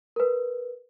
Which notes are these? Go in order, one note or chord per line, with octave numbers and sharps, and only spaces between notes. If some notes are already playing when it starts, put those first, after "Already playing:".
A#4 B4